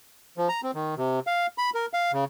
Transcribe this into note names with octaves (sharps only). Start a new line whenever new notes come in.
F3
A#5
C4
D#3
C3
F5
B5
A#4
F5
C#3